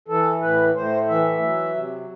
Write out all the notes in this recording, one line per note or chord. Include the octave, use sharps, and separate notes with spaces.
E3 A4
A2 B4
A2 C5
E3 E5
F#3
C3